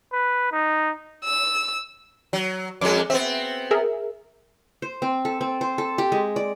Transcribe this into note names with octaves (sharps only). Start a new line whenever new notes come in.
B4
D#4
E6
F#3
F2 G#3 D6
B3 C4 E5
G#4 A#4 E5
C5
C4
A4
C4
C5
A4
G4
G#3
D5